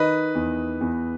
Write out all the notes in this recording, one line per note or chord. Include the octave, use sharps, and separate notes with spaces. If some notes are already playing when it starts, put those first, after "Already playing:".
Already playing: D#3 B4 D#5
E2
E2